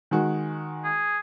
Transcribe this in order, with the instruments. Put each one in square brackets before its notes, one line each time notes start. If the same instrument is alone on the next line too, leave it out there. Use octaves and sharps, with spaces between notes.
[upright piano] D#3 G#3 F#4
[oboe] G#4